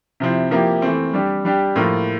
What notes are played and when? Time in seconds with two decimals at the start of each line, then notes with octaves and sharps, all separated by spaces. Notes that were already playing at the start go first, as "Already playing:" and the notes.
0.20 C3 F3 C4 E4
0.51 F3 A#3 E4 G4
0.82 E3 A3 C4
1.14 G3 D4 G4
1.45 G3 D4 G4
1.76 A2 F3 A#3 F4